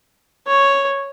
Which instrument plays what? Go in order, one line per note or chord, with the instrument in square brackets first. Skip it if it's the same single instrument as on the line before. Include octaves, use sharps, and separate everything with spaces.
[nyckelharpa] C#5